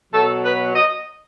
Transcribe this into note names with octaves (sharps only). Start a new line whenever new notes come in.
B2 F#3 A4
B4
D#5